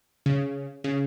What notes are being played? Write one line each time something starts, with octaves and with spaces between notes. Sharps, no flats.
C#3
C#3